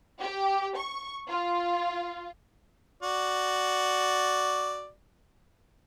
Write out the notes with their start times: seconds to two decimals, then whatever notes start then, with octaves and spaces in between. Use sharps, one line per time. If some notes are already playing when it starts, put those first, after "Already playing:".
0.20 G4
0.76 C#6
1.27 F4
3.03 F#4 D5